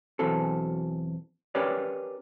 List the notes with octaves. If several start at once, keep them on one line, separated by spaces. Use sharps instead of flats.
E2 B2 E3 F#3 C4 A4
C#4 G4 A#4 B4 C#5 D5